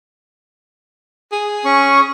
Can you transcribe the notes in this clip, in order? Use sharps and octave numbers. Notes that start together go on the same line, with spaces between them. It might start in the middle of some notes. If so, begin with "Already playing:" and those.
G#4
C#4 C#6